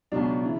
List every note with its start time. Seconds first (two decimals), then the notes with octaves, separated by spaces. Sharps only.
0.12 C#2 B2 F#3 D4
0.43 C#3 E3